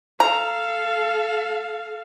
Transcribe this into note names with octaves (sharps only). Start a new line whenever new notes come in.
A4 F5 A#5